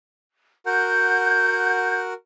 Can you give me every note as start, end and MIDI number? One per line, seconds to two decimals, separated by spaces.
0.66 2.13 66
0.66 2.13 70
0.66 2.13 78
0.66 1.98 91